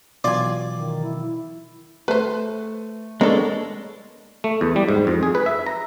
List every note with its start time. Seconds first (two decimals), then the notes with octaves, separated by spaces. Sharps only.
0.24 B2 E3 F#3 F4 D5 G#5
0.75 D#3
1.04 E4
2.08 A3 B4 C5
3.21 G#3 A#3 B3 D4 A4 C#5
4.44 A3
4.61 E2
4.76 G3
4.89 G#2
5.07 F2
5.23 G#4
5.35 B4
5.46 E5
5.66 A#5